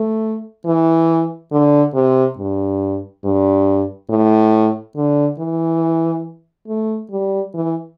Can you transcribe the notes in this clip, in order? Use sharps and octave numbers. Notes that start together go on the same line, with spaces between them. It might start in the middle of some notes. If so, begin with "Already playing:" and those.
Already playing: A3
E3
D3
C3
G2
G2
A2
D3
E3
A3
G3
E3